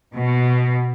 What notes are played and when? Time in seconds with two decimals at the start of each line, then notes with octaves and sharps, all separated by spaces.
0.15 B2